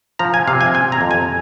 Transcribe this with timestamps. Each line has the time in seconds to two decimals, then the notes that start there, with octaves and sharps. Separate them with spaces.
0.19 F3 A#5
0.34 G#5
0.47 C3 F5
0.61 G#5
0.74 C4 G#5
0.92 A#5
1.01 F2
1.11 G#5